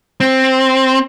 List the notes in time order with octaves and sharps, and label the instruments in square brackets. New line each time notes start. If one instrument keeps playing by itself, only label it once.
[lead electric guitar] C4